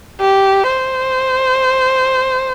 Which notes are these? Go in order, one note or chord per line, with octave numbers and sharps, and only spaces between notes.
G4
C5